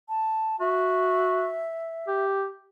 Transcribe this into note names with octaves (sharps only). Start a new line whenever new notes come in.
A5
F#4 E5
G4